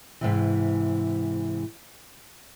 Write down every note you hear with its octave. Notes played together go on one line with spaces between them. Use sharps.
G#2 C3 E3